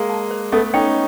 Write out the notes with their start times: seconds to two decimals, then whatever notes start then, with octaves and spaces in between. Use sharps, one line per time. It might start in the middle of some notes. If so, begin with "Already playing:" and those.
Already playing: G#3 A#3 F5
0.09 A5
0.31 C5
0.52 A3 B3 A4
0.73 C#4 D#4 G5